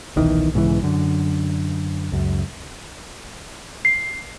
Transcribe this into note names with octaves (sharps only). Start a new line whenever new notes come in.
D#1 B1 D#3 E3
B1 G#2 C#3 E3
F#2 D3
C#2 F#2
C7